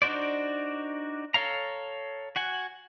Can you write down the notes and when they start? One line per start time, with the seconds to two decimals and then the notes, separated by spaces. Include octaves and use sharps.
0.02 D4 D#4 F#4 C5 D5
1.34 A4 C#5 F5 A#5
2.36 F#4 F#5 G#5